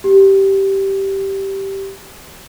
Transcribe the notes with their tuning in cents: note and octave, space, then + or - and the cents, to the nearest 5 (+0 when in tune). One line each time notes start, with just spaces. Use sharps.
G4 -10